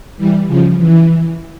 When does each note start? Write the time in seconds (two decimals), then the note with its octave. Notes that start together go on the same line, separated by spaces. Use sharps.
0.17 E3 G3
0.47 C#3 F3
0.78 E3